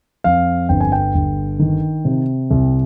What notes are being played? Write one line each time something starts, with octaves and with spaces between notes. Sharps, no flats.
F2 F5
G1 G5
G#5
G5
G1
D#3
C3
C2